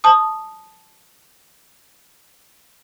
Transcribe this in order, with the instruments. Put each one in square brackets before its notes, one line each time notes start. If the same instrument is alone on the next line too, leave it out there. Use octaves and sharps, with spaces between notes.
[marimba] A5 D#6